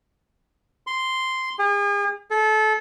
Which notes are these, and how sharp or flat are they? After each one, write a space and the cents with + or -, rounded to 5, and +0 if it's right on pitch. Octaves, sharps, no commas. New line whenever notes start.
C6 -5
G#4 -40
A4 -25